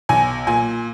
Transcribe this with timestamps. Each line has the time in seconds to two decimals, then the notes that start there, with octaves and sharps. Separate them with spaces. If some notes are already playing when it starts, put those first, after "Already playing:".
0.09 B1 G#5
0.47 A#2 G#5